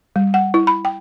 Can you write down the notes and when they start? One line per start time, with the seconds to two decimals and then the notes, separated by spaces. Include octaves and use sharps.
0.16 G3
0.34 F#5
0.54 E4
0.67 B5
0.85 G5